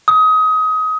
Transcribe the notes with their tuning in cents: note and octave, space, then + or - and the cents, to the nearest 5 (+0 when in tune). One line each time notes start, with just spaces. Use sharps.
D#6 +25